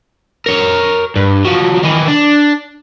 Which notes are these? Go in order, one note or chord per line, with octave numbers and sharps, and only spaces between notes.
A#4 C#5
G2
F3 F#3
D#3 E3
D4